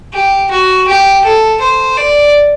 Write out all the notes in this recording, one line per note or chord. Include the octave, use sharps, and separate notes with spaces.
G4
F#4
G4
A4
C5
D5